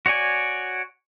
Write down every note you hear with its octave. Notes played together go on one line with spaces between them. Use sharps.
F#4 C#5 D5 G#5